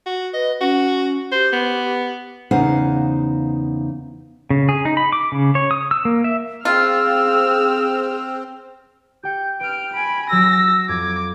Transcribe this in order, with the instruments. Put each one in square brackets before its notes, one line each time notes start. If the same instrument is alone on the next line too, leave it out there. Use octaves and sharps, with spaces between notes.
[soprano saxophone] F#4
[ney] B4 [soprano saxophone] D#5
[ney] C#4 [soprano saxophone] F#4
[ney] G4 [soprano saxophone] C5
[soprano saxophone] B3
[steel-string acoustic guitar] E2 C#3 D#4 C5 F5 F#5
[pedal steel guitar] C#3
G#4
D#4
B5
D6
C#3
C#5
D#6
E6
A#3
E5
[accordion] C4 [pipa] F4 [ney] G#4 [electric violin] E6 F6
[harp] G4 G5 C#7 [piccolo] G6
[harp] B4 [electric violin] G5 F6 [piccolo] D7
[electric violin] G#5 B5 [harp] C6
[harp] F#3 D7 [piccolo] E6 [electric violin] A#6
[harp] F2 [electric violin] D6 [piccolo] G#6